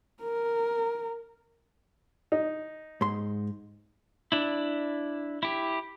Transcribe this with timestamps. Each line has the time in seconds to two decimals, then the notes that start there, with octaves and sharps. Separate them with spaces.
0.23 A#4
2.32 D#4
3.01 G#2 C6
4.32 D4 E4
5.43 E4 G4